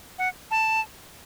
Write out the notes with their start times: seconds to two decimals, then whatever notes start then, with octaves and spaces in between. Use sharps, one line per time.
0.18 F#5
0.51 A5